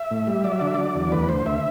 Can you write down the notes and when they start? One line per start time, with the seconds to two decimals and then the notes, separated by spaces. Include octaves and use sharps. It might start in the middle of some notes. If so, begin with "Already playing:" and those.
Already playing: E5
0.11 A2
0.27 G3
0.44 F#3 D5
0.52 E5
0.59 D3 D5
0.67 E5
0.75 F#3 D5
0.95 E2
1.12 D2 B4
1.29 D2 C5
1.46 D2 E5